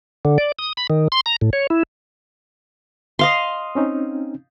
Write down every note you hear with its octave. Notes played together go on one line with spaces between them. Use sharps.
D3
D5
D#6
B5
D#3
C6
A#5
A2
C#5
E4
D#5 F5 C6
C4 C#4 D#4